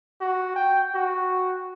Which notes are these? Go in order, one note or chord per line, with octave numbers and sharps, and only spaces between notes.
F#4
G5
F#4